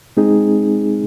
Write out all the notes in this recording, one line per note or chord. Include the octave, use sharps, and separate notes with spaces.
G#3 C4 D#4 G#4